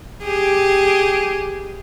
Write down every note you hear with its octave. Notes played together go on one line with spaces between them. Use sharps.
G4 G#4